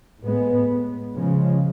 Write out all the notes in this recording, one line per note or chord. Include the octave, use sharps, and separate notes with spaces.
A2 G#3 B3
C#3 F3 G#3